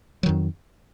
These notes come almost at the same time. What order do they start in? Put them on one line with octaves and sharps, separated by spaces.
F#3 D#3 F2